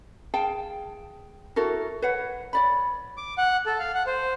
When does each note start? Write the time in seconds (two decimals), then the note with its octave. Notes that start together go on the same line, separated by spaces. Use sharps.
0.34 G#4 F5 G5 A5
1.56 E4 F#4 A4 A#4
2.02 B4 C#5 F#5
2.53 C#5 D5 B5
3.17 D6
3.38 F#5
3.66 A4
3.79 F5
3.95 F#5
4.06 C5